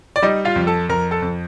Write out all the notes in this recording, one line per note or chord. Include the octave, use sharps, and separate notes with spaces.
D5
G3 D#4 D#5
F4 F5
F2
A4 A5
F2 A#4 A#5
A4 A5
F2